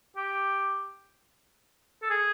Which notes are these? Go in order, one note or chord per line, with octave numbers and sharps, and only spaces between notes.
G4
A4
G#4